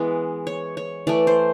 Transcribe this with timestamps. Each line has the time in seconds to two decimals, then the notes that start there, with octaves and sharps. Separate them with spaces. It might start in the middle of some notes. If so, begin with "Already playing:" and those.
Already playing: E3 G#3 B3
0.47 C#5
0.77 C#5
1.07 E3 A3 D5
1.27 C5